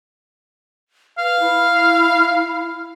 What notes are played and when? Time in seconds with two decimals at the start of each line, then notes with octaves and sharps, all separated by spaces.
1.18 B4 F5
1.40 E4